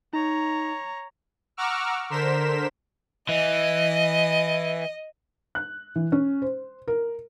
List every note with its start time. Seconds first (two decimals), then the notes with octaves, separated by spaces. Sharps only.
0.13 D#4 C#5 A#5
1.57 F#5 A#5 C#6 D6 E6 F6
2.10 D3 A#4 C5 B6 E7
3.29 E3 D#5
5.55 F#6
5.96 E3
6.12 C#4
6.42 C5
6.88 A#4